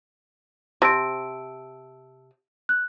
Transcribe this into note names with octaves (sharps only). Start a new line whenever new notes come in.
C3 A5 E6 D7
F#6